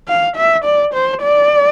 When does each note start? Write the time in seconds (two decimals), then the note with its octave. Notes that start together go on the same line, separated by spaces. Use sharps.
0.09 F5
0.37 E5
0.65 D5
0.94 C5
1.22 D5